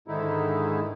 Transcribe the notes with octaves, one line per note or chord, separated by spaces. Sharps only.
G#2 D3 D#3 G#3 D#4 E4